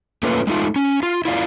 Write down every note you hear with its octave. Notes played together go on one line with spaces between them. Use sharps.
A3 A#3 C#4 F4 B4
G#3 A3 D#4 F4
C#4
F4
E4 F4 D5